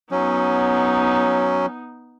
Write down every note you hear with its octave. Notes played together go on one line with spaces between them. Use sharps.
F#3 B3 C#4 D#4